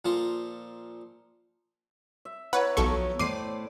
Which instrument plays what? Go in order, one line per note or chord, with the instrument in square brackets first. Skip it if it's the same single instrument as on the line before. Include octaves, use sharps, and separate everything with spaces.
[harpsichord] A#2 F3 A4 A5 A#5 C6
[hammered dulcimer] E5
[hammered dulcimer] E4 C#5 A#5 [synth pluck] B4 F#5
[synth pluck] B1 A4 C#6 [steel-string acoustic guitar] F3 F#3 B3
[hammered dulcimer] A2 C5 [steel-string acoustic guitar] A3 D5 [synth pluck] D6 C7 D#7